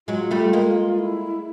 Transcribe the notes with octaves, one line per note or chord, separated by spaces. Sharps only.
F#3 G#3 F4
G3 A3
G#3 A#3
E4